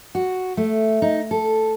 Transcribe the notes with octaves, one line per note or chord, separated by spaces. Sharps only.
F#4
A3
D#4
A4